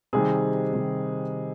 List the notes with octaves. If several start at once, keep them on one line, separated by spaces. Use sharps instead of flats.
C3 D#3 G3 G#4
C3 D#3 G3